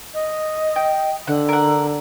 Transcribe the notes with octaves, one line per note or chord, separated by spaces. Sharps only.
D#5
G5
D3 F#5 F#6
A#4 F#5